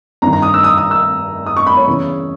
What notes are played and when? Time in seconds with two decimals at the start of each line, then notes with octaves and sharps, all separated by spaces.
0.22 G2 D#3 A#5
0.33 A#5
0.42 D#6
0.54 E6
0.64 D#6
0.77 D#6
0.91 E6
1.46 D#6
1.57 C#6
1.67 B5
1.77 C#5
1.86 E2 C#3 E3